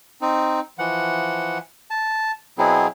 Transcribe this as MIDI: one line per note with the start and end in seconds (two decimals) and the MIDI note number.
0.21 0.60 60
0.21 0.60 63
0.79 1.58 52
0.79 1.58 53
0.79 1.58 78
1.91 2.32 81
2.58 2.87 47
2.58 2.87 54
2.58 2.87 59
2.58 2.87 60
2.58 2.87 64
2.58 2.87 68